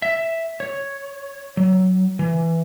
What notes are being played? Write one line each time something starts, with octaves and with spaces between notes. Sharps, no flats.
E5
C#5
F#3
E3